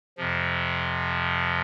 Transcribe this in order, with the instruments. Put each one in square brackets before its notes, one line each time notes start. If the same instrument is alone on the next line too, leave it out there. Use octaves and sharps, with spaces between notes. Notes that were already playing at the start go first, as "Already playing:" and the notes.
[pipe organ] F2 C3 F3